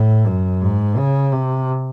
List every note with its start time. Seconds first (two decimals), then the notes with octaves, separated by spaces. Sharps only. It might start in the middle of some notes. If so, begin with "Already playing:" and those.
Already playing: A2
0.26 F#2
0.62 G#2
0.98 C#3
1.32 C3